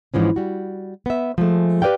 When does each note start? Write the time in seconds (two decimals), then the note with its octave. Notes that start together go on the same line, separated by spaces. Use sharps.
0.14 G#2 E3 F3 C#4
0.36 G3 F#4
1.06 B3 E5
1.38 F3 G#3 A3
1.82 G4 B4 D5 F5 G5